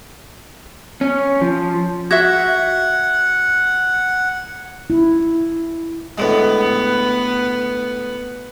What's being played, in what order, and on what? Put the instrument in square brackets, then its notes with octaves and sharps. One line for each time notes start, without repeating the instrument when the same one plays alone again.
[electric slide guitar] C#4
F3
[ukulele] F#4 E5 [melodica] F#5 [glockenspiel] G#6
[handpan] E4
[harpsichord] D2 A2 G#3 [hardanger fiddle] B3